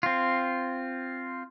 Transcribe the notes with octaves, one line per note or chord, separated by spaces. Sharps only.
C4 F4